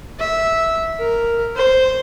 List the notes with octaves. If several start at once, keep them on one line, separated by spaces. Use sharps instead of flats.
E5
A#4
C5